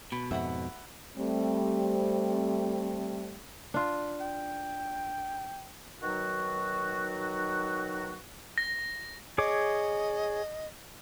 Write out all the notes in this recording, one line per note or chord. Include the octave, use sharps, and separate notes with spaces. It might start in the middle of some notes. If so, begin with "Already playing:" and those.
B2 B5
F2 G#2 E5 F#5 B5
G3 A3 C4
D4 F4
G5
B2 D#3 F#3 D#4 F#4
A#6
G#4 C#5 D#5 D6